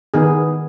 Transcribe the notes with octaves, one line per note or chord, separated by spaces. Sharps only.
D#3 B3 D#4 G#4